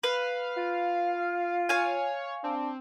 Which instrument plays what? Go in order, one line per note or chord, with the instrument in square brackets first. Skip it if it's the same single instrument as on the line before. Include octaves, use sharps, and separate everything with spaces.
[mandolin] B4 [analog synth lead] F5
[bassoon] F4
[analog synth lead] C#5 [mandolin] F5 G#5
[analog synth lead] C4 [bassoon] D4